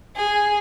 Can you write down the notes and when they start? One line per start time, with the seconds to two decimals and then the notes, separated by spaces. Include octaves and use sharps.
0.16 G#4